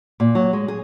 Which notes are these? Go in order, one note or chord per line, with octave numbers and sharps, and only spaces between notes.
A#2
F#3
G#3
G#4